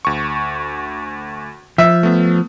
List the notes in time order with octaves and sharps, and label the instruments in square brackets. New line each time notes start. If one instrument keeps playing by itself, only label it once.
[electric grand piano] D2 C#6
[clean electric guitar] F3 [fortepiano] E5
[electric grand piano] A3 B3